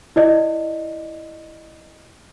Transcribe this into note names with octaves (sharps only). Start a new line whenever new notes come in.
E4 D5 D#5